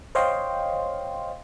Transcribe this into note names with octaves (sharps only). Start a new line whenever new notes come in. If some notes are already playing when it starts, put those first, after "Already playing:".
C5 C#5 D#5 F5 G5 C6